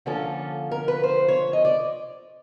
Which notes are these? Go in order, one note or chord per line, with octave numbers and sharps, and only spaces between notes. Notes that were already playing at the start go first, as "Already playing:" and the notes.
D3 F3 A#3 C#4 F4 A4
A#4
B4
C5
C#5
D#5
D5